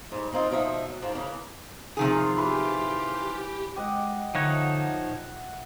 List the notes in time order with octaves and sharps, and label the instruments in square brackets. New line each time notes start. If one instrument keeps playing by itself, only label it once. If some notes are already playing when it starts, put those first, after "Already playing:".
[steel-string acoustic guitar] G#2 G3
A#3 C4 D#4 F4
B2 D3 F3 D#4 E5
F#3
G#2 F3
C#3 E3 A#3
[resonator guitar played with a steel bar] C3 D#3 G#4 [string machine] F3 [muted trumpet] F4
[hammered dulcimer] E3 B4 [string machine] G4
[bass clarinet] G#3 [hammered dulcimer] G4 D#5 F#5
[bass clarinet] D3 [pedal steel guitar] F3 D#4 C#5 [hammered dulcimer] E5 F#5
[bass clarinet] A#2